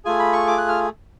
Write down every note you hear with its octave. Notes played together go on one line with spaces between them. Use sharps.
A3 F4 G#4 G#5
B5
C#6
D6
F#6
F6